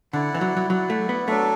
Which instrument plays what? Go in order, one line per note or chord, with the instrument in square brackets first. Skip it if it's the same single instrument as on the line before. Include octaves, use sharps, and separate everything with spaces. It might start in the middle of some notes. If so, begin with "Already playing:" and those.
[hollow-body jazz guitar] D3 [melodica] E4 D5 F#5
[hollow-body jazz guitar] E3
F#3
F#3
[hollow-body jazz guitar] F#3 [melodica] E4 D5 F#5
[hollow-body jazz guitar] A3
B3
[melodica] F#3 D4 A4 [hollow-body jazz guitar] A3